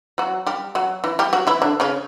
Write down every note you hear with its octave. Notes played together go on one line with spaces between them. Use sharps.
F#3 F#4
G3 G4
F#3 F#4
E3 E4
G3 G4
F#3 F#4
E3 E4
D3 D4
C#3 C#4